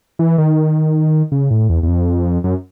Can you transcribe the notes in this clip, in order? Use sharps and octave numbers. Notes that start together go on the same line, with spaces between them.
E3
D#3
C#3
A2
E2
E2
F2
F#2